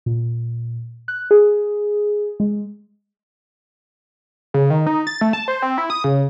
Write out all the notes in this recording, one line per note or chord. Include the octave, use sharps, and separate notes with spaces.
A#2
F#6
G#4
G#3
C#3
D#3
D#4
A6
A3
A5
C5
C4
E4
D#6
C#3